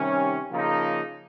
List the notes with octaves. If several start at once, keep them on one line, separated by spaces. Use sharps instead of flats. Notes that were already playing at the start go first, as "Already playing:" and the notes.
Already playing: C3 D#3 G3 C#4
C#3 F3 A#3 D#4